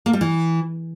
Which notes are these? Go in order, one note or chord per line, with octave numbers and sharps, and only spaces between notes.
A#3
G3
E3